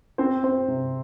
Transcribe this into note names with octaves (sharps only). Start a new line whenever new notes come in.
C4 C5
C4 C5
C3